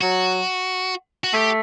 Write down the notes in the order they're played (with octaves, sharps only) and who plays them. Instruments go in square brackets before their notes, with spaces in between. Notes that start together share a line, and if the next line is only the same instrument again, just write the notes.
[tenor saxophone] F#3 [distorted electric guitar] F#4
[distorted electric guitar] F#4
[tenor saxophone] A3 [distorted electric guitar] G4